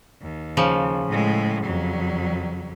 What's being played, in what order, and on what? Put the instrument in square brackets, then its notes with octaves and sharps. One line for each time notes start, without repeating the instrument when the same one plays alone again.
[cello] D#2
[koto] C#3 F3
[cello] A2 G#3
F2 F#3